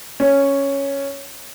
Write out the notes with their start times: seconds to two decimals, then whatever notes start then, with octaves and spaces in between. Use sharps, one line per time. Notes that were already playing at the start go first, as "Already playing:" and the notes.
0.20 C#4